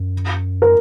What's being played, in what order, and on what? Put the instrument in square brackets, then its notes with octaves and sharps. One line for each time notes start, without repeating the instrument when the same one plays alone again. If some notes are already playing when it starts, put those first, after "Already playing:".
Already playing: [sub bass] F#2
[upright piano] A#4